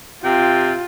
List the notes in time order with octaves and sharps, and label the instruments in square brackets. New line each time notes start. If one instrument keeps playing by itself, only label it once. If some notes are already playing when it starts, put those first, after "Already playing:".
[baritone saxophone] C3 [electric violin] F4 [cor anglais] G5